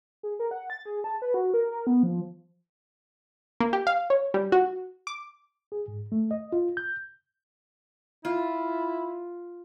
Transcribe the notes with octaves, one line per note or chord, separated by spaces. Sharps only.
G#4
A#4
F#5
A6
G#4
A5
B4
F#4
A#4
A#4
B3
F3
A#3
G4
F5
C#5
G3
F#4
D6
G#4
G#2
A3
D#5
F4
G6
E4 F4